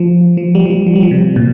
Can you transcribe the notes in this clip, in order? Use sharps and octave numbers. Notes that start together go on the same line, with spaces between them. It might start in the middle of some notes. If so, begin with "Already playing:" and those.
Already playing: F3
F3
G3
F3
G3
F3
G3
F3
C3
A#2